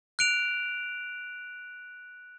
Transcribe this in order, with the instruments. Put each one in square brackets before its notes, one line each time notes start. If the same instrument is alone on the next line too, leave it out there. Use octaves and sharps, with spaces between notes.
[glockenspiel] F#6 D7 F7